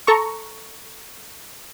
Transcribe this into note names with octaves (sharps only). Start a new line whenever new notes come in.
A4 A#5 C#6